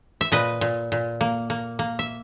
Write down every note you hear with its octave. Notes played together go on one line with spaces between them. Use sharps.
E5
A#2 B4 D#5
A#2
A#2
A#3
A#3
A#3
E5